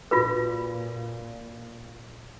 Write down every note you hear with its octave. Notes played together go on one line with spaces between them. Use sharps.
A#2 F4 F#4 B4